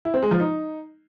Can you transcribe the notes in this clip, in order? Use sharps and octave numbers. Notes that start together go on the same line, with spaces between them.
E4
C4
G#3
F3
D#4